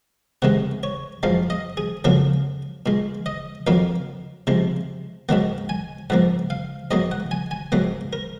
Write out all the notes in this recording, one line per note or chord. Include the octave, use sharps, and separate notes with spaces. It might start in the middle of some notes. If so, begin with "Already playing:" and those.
C3 D#3 G#3 F#5
C#5
F#2 F3 G#3 F5
D#5
G#4
F2 C#3 F#3 A#3 A#4
A#2 G#3
D#5
F2 D#3 F#3 A#3 F5
C3 F3 G#3
G#2 D#3 F#3 A#3 F#5
G#5
G#2 F3 A#3 F#5
F5
G#2 F#3 A#3 D#5
F#5
G#5
G#5
G#2 F#3 A#3 F#5
A#4